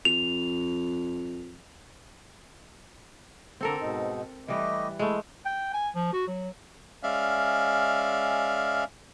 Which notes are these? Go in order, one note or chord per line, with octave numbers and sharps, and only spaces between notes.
F2 F7
D3 C4 A4 A#4
G#2 B2 D#4
E3 G3 A3 G4 B4 D#5
G#3 A3 E4
G5
G#5
F3
F#4
F#3
G#3 C#4 D5 E5 F5 F6